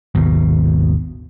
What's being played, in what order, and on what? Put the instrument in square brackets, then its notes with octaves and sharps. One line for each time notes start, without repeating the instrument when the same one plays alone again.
[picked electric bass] G#1 D#2 B2